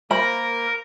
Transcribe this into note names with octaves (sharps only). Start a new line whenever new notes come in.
A#3 A#4 C5 F5 B5 A#6